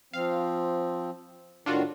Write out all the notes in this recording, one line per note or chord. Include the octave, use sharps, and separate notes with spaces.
F3 C4 F5
A2 D#3 D4 F4 F#4